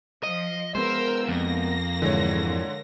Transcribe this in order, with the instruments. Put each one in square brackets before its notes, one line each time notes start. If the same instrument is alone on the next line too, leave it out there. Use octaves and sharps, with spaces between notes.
[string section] F3 [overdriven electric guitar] D#5
[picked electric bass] G#3 A3 B3 [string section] A#4 E6 [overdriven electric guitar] C5
[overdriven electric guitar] F2 [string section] A#3 A#6
[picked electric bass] G#2 E3 [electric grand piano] D3 G#3 C#5